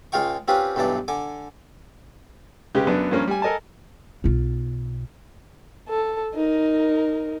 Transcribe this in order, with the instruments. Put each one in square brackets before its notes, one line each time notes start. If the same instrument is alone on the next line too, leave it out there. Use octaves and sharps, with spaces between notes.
[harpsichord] C#2 G#3 F4 F5 G5 C#6
C4 C#4 F4 G4 B4
B1 G2 E3 D4 D5
D3 G#5 D6
[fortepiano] C#3 G#3 G4 B4
F#2 B3 D4
G2 F3 A#3 C#4
G3 G#5
A4 A#4 D#5 G#5 A5
[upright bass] B1 F4
[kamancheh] A4
D#4 A#4